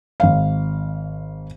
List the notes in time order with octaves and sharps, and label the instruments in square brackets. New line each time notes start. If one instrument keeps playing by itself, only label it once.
[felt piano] G#1 F5